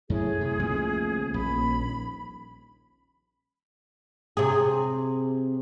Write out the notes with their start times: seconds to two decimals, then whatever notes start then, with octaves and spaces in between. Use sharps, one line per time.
0.10 F#2 A2 G#4
0.41 A2 C3
0.59 D#1 C#2 F3 A3
1.34 A#1 B5
4.37 C3 G#4